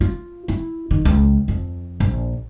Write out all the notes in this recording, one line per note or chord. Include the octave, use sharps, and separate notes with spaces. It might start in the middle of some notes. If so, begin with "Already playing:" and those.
F4
E4
D#3
C#2
F2
A#1